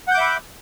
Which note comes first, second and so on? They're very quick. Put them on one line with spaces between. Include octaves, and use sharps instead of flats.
F#5 G6 D6 E5 B5